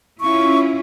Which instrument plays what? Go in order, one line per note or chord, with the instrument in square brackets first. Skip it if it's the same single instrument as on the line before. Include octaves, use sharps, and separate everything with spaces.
[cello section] C#4 E4 F4 [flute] C#6